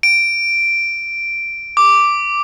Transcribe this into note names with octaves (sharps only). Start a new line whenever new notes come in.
D7
D6